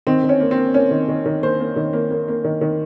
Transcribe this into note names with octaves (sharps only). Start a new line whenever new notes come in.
D#3 C4
D#3
C#4
A#3
C4
A#3
A#3 C#4
D#3
D#3
D#3
A#3 C5
A#3
D#3
A#3
A#3
A#3
D#3
D#3